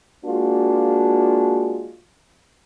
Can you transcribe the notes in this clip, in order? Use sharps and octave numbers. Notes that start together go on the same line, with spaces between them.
G#3 A#3 D4 F4 F#4